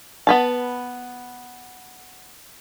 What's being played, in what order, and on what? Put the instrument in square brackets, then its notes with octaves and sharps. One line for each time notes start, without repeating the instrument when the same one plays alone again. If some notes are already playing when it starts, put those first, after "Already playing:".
[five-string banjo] B3 B4 A5